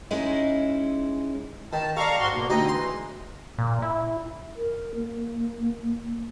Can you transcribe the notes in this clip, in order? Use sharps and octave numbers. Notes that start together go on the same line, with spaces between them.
G#3 C#4 D#4 E4
D#3 A5
A4 D5 F5 A#5 C#6
G#2 F#4 C6
B2 A#3
D2 D#4 D#5 G5
E3 G#3 C6
A#2
E4
A#4
A#3